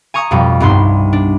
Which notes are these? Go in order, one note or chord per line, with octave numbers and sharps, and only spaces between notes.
G#5 A#5 C#6 D#6
F2 B2 G3
C2 G2 B3 D#4 C6
D4